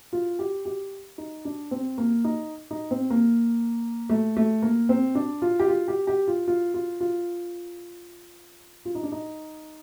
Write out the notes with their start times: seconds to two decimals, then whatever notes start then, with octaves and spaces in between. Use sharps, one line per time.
0.13 F4
0.39 G4
0.65 G4
1.18 D#4
1.45 D4
1.71 C4
1.98 A#3
2.24 D#4
2.71 D#4
2.91 C4
3.10 A#3
4.10 A3
4.37 A3
4.62 A#3
4.89 C4
5.15 D4
5.42 F4
5.59 G4
5.68 F4
5.88 G4
6.07 G4
6.28 F4
6.48 F4
6.74 F4
7.00 F4
8.85 F4
8.95 D#4
9.03 D4
9.12 D#4